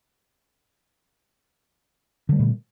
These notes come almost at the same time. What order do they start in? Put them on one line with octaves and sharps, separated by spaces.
D3 G3 A3 A#2